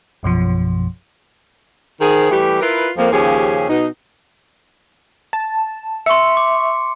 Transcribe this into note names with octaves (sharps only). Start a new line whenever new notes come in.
A#1 F#2 B2 F3
D#3 F3 G#4
E3 G3 A3 G4
E4 F4 A#4 B4
F2 F3 A#3
D#2 C#3 F3 C#4 G4 G#4
B2 D#4
A5
E5 C6 C#6 C#7
D6